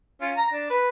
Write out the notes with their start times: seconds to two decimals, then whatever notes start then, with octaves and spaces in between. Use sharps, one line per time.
0.21 C#4 F4
0.37 A#5
0.51 D4
0.70 B4